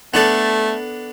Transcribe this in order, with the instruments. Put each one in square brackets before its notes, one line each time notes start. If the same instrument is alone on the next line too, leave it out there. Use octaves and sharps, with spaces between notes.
[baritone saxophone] A3 [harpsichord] B3 D4 A4